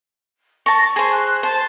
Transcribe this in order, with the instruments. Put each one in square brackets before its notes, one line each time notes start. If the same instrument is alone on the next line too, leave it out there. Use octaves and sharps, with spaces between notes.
[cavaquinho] A5 C#6 [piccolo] A#6
[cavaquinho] G#4 C5 [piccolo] C#6
[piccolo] F#6
[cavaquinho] C5 [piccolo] A5